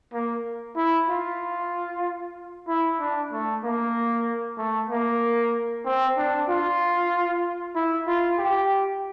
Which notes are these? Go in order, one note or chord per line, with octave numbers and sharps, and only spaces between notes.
A#3
E4
F4
E4
D4
A3
A#3
A3
A#3
C4
D4
F4
E4
F4
G4